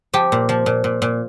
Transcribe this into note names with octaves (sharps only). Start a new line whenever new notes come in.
F3 G4
A#2
F3
A#2
A#2
A#2